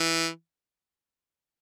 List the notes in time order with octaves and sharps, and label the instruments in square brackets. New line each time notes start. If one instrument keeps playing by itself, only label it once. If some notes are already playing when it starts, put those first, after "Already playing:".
Already playing: [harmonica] E3